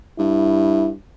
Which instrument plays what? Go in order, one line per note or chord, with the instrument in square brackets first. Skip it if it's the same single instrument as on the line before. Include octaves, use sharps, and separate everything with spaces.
[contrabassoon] G2 [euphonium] E4